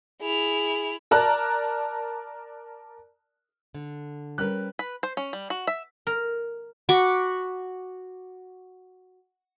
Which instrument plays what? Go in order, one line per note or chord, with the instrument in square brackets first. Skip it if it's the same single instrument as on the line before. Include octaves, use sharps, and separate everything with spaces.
[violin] E4 F7 [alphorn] G#4
[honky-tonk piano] A#4 D5 A5 A#5 F#6
[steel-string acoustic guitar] D3
[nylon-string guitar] G3 C#4 B4 [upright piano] A#4 F#6
[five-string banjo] B4
C5
C#4
G3
F#4
E5
[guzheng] A#4
[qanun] F#4 B5 C#6 D6